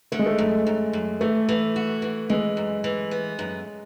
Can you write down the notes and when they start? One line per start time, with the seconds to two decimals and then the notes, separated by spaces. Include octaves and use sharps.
0.12 D3 A3
0.19 G#3
0.26 A3
0.39 F#2
0.67 F#2
0.93 F#2
1.21 E3 A3
1.49 E3
1.76 F#4
2.02 E3
2.30 E3 G#3
2.57 F#2
2.84 E3
3.11 B3
3.39 F#2